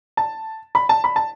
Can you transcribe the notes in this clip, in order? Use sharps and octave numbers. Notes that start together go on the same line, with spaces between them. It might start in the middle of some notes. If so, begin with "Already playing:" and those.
A5
B5
A5
B5
A5